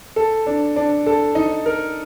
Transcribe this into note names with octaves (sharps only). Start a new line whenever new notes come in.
A4
D4
D4
A4
D#4
A#4